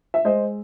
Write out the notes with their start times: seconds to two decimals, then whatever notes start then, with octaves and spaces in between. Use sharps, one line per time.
0.14 E5
0.24 G#3 C5 D#5